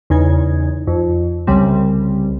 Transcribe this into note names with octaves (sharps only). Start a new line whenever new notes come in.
E2 C#3 D#4 G#6
F2
C2 C#3 G3 C4